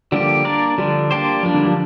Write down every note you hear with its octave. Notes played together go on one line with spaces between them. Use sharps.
D3 F3 G3 A#3 G4
A#3 D4 A#4 D5
D3 F3 G3 D4
A#3 D4 G4 C5
F3 G3 A#3 D4
D3
F3